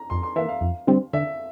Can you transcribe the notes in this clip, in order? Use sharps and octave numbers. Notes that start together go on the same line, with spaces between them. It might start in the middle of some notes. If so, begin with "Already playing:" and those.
Already playing: A#5
F2 C6
C6
E3 A#3 E5
F5
F2
D3 G3 C4
D3 E5